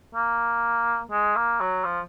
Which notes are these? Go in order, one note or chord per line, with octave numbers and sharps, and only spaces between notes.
A#3
G#3
A#3
F#3
F3